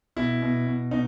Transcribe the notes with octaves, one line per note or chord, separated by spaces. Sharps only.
B2 E4
B2
B2
B2 D#4